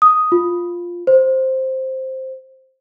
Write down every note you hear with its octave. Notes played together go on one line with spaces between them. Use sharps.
D#6
F4
C5